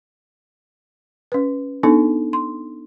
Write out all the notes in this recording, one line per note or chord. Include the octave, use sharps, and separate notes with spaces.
C#4 B4
B3 D4 D#4 A4
C6